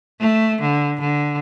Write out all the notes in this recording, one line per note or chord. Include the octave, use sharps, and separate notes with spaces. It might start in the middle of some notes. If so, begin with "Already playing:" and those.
A3
D3
D3